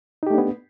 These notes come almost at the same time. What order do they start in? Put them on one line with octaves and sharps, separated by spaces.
D#4 G4 A3 D4 B3